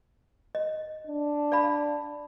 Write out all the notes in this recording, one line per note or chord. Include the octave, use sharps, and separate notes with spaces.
D#5
D4
D5 F5 B5